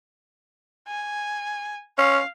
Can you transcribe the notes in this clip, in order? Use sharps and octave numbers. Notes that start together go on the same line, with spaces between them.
G#5
C#4 F5